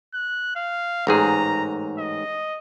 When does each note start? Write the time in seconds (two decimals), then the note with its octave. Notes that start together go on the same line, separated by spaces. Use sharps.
0.14 F#6
0.56 F5
1.07 A1 G#2 G#4 A#5
1.99 D#5